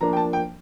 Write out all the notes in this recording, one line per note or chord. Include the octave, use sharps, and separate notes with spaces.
F3 A#3 D4 A#5
G5
A5
G5